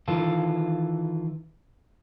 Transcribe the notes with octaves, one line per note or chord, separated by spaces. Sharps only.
D#3 E3 F4 A4